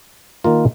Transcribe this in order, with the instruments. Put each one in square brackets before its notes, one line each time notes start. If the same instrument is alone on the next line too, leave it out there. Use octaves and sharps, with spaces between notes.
[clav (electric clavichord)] D#3 A#3 F4 A#4